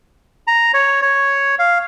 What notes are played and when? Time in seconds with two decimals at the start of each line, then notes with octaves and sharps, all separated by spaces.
0.47 A#5
0.74 C#5
1.02 C#5
1.59 F5